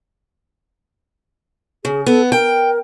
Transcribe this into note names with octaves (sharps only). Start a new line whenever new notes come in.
C#3 G#4
B3 A4
A#4 G5